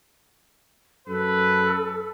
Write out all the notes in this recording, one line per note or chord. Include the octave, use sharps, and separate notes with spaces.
F#2 A4 B4